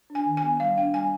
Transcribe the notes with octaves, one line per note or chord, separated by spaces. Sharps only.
D4
G#5
D#3
G#5
B3
G3 F5
D4 G5
G3 G#5